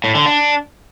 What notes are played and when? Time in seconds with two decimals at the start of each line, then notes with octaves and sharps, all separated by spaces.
0.04 A2
0.15 D3
0.26 D4